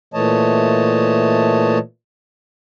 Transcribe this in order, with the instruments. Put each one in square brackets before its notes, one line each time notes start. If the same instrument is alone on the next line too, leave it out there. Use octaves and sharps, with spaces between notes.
[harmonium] A#2 E3 A3 C#5 D#5 A5